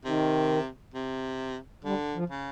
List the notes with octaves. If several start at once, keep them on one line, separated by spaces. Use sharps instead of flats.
C3 D#3
C3
D3 G3
F3
C#3